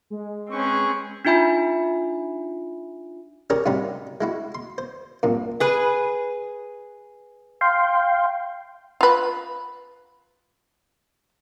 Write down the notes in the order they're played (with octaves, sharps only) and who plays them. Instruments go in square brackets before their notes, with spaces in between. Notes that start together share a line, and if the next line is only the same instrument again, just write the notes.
[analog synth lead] G#3
[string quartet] C4 C#4 G#4 [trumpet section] B4 C#6
[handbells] D4 D#4 F4 E5 G#5 B5
[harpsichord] C#4 G4 G#4 A#4 C#5 D5
G#2 C3 G3 C#4 D#4 F#4
G#3 E4 F#4
C6
C5
C2 F#2 A#2
[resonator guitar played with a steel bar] G#4 B4
[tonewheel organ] F5 G5 C6
[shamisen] F4 B4